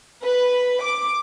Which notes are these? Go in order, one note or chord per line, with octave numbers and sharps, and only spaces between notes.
B4
D6